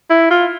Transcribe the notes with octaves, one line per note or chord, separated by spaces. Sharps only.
E4
F4